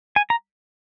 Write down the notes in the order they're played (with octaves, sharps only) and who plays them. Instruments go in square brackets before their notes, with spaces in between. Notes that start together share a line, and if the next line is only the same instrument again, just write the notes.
[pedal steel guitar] G#5
A#5